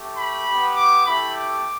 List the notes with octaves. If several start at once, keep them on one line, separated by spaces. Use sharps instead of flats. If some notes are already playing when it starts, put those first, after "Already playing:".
Already playing: A3 G4
B5
B3 G4
D6
A3 E4 G4 B5
D6